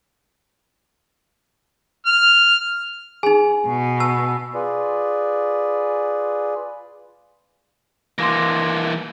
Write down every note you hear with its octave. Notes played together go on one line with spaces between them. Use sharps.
F6
D#4 G#4 G#5
B2
A5 E6
F4 G#4 B4 D5
E3 A#3 C6 D6 A#6